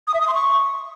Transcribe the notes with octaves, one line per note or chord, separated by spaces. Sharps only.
D#6
E5
D#6
C6
C#6